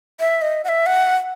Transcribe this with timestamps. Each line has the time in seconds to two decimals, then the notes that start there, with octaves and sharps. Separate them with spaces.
0.20 E5
0.42 D#5
0.64 F#5
0.68 E5
0.86 F#5